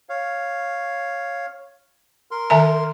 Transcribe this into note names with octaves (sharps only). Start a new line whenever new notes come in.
C#5 F5
A#4 C6
D#3 E5 A#5